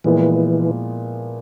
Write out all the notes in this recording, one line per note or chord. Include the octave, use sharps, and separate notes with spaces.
A#2 E3 F3 G#3 B3 E4